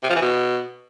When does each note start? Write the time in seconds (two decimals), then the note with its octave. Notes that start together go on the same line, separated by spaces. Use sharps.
0.03 C3
0.09 F3
0.16 E3
0.22 B2